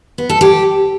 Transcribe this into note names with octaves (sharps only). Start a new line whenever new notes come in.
B3
A4
G4